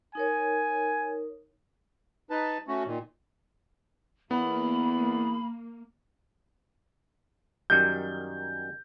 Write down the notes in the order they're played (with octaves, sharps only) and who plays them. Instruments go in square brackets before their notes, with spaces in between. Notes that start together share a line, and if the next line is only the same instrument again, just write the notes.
[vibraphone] D#4 A#4 C#5 [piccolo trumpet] G#5
[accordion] D#4 B4 A5
A3 C#4 F#4
A#2 D#3
[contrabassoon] E2 [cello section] A#3 [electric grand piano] B3 [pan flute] B5
[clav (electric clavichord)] F#2 D#3 G3 [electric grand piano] G6